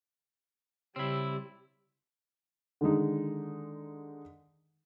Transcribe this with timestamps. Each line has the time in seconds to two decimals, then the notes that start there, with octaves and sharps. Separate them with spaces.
0.96 C#3 G3 C4 E4
2.81 D3 D#3 G#3 D#4